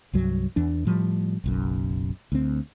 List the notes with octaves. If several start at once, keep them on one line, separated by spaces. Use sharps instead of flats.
C2 G2 F#3
E2 E3 D4
A2 F3 G3
F#1 B1 F#2
D2 C4